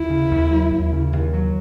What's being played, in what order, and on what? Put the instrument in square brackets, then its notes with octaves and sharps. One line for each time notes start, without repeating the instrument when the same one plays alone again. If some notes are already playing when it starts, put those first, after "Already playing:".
Already playing: [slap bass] D#2 [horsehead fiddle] E4
[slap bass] C#3
D#2
F#3
D#2
C#3
D#2
F#3